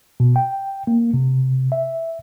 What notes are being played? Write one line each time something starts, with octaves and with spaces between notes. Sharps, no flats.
B2
G5
A#3
C3
E5